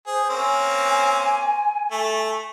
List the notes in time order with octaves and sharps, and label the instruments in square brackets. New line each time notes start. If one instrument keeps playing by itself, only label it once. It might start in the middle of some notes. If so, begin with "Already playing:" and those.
[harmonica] G#4 [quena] C5
[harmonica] A#3 C4 C#4 [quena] G#5
[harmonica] A3